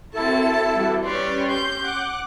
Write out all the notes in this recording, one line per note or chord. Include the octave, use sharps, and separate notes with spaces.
C4 E4 F#4 A4 A#4 A5
E3 G3 F#4
G3 C#4 G4 B4 C#5 D5 C6
G6
F#5 D6 F#6